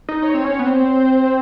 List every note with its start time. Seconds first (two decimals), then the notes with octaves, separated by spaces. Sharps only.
0.09 D#4
0.22 D#4 C#5
0.34 C4
0.44 C#4
0.59 B3
0.65 C4 C5